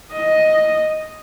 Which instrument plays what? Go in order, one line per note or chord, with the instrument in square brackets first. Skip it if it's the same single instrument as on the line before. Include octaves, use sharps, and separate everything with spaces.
[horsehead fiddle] D#5